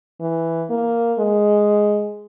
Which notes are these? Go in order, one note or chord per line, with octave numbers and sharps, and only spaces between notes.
E3
A#3
G#3